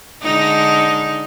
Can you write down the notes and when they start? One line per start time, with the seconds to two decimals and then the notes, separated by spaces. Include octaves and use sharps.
0.23 D3 G#3 D#4